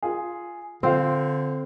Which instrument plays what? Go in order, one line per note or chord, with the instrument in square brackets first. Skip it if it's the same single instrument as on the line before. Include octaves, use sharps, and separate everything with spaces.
[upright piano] F4 G#4
[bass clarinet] D3 [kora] C4 [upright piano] F4 F5